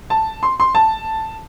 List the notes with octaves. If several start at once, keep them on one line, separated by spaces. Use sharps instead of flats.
A5
C6
C6
A5